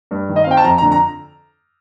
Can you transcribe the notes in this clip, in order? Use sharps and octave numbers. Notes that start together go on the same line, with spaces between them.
G2
D#3
D#5
F5
C4 G5
A5
F2 A#5
A#5
D3
A#5